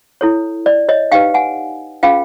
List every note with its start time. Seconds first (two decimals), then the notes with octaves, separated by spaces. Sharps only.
0.21 E4 A4 C#5
0.66 D5
0.89 C#5 D#5
1.12 D#4 G4 B4 F5 G5
1.34 F#5 G#5
2.03 C#4 F4 G#4 B4 F5 G5